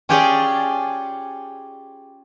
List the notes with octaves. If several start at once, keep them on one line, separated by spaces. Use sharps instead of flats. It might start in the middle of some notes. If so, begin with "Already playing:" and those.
C#4 F4 G4 G#4 C#5 D5